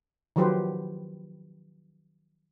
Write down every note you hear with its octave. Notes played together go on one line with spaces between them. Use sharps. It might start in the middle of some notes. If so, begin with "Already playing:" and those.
D#3 F3 F#3 G4 B4 C5